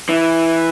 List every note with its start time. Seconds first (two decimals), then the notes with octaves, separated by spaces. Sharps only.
0.09 E3